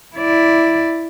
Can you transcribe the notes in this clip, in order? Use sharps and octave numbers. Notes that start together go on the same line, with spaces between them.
E4 D5